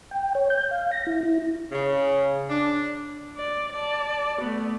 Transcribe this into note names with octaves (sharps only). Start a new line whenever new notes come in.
G5
C#5
G6
F5
A#6
E4
E4
C#3
D4
D5
D5 A5
A3 B3